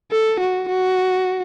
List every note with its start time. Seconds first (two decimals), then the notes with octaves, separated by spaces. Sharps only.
0.11 A4
0.40 F#4
0.69 F#4